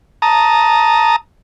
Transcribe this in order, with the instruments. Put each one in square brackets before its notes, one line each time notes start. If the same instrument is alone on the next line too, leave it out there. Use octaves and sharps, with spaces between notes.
[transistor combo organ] A5 A#5 D#6